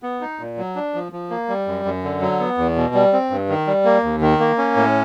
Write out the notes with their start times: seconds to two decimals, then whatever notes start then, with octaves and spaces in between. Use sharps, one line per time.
0.03 B3
0.21 D#4
0.39 A#2
0.58 F#3
0.76 D4
0.94 F3
1.12 F3
1.30 A#3
1.48 G3
1.67 F#2
1.85 F#2
2.04 D3
2.21 F#3
2.40 B3
2.58 E2
2.76 B2
2.94 G3
3.13 C4
3.30 G2
3.49 D#3
3.67 G3
3.85 A#3
4.03 D#2
4.21 D#3
4.40 A#3
4.58 C#4
4.76 A2